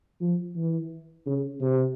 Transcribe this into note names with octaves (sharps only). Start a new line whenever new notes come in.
F3
E3
C#3
C3